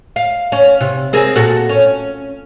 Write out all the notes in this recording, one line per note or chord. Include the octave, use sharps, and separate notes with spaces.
F5
C#4
C3
C4 G#4 A#4
A#2 F#4 A4
C#4